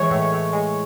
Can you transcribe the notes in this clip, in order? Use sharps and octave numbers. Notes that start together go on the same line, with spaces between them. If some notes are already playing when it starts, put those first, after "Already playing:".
Already playing: E3 G#3 C#5
A2
A2
G#3